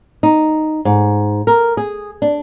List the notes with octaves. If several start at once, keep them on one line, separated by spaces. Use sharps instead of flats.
D#4
G#2
A#4
G#4
D4